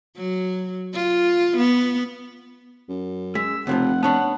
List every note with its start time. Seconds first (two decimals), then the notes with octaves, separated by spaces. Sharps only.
0.17 F#3
0.94 F4
1.57 B3
2.89 F#2
3.35 G#3 E6 B6
3.67 F1 C#2 C3 F3 F#5
4.03 B3 C#4 D4 F#5 A5